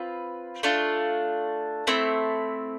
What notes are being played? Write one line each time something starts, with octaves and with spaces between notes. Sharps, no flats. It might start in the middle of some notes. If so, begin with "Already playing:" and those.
Already playing: C4 F4 B4
A3 D4 F4
A3 C4 E4